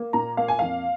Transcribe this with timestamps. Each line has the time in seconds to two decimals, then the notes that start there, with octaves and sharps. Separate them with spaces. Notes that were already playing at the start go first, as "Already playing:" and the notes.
Already playing: A#3
0.13 A#2 A#5
0.37 A#3 F5
0.48 G#5
0.59 F2 F5